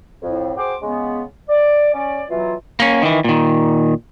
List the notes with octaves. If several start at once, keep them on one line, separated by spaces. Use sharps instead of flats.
F2 A2
F#4 G#4 C5 G5 C6 D6
C#3 G#3 B3
D5
C#4 D5
B2 E3 F#3 F4
A#3 C#4
D#3 E3
A#2 D#3